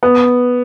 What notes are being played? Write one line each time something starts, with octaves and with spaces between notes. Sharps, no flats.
B3